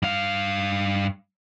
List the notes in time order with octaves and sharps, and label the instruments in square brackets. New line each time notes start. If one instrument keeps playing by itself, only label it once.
[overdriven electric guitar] G2 F5